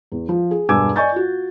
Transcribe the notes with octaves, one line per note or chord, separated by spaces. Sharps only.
E2
F3
G#4
E1 G2 G#5 D6 E6 G#6
D5 D#5 G#5 C#6 G6 A6
F4 F#4